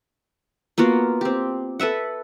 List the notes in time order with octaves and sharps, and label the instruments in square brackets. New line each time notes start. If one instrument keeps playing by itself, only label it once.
[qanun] A#3 B3 F4 F#4
C4 G4
A4 B4 E5 F#5